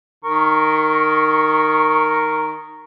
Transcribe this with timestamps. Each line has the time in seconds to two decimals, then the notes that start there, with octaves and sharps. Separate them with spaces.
0.25 D#3 A#4 C#6